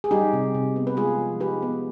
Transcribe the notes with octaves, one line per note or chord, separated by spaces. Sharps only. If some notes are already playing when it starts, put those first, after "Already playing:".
G#4
G3 D#4 G4
C3
C3
B3
B4
G#3 F4 G#4
F3
D#4 G4 B4
B3